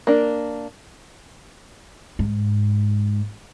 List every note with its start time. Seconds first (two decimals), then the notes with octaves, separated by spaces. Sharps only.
0.07 A#3 D4
2.19 G#2